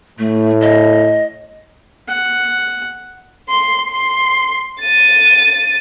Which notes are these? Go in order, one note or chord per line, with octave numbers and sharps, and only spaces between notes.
A2 A3
D#5
F#5
C6
C6
A6 D#7